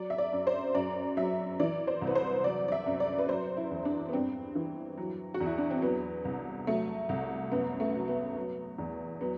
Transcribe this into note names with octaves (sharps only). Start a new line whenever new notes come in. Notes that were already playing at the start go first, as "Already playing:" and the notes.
Already playing: F#3 D5
E5
D5
F#2
C5
F#2 D5
F#3 E5
E3 D5
C5
C2
B4
C5
F#3 D5
D5
E5
F#2
D5
B4
F#3 C5
E4
E2
D4
B3
G2 C4
E3
F#3
F#4
E2
E4
D4
C4
F#3 B3
C2
F#3 A3
C2
F#2 B3
A3
F#3
B3
F#3
E2
F#3 B3